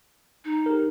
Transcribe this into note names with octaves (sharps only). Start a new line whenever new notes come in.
D#4
G4 A#4